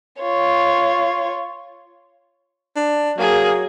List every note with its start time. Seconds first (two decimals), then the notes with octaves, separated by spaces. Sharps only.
0.21 F4 C#5
2.76 D4
3.18 F#3 A#3 G#4